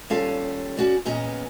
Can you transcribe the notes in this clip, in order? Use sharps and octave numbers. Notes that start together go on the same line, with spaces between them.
D#2 G3 C#4 F4 A4 F5
C#4 F#4 D5
E2 A#2 B3 C#4 D#5 A#5